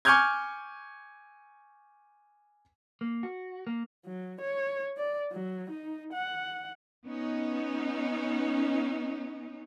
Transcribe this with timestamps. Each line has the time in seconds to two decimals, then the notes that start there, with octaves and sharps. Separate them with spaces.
0.05 G#5 C#6 D6 F6 G6 G#6
3.01 A#3
3.23 F#4
3.67 A#3
4.06 F#3
4.41 C#5
4.97 D5
5.32 F#3
5.71 D#4
6.13 F#5
7.05 B3 C#4 D#4